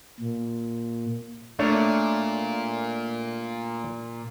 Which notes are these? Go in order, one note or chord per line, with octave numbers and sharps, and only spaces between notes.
A#2
A#2 A3 D4 C#5